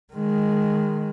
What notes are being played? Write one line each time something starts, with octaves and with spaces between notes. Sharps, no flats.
D#3 G#3